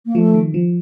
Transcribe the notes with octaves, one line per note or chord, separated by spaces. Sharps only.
A#3
F3 A3
D#3
F3